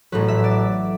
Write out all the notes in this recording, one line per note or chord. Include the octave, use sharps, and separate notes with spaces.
A1 A2 F#3 B4
E5
D5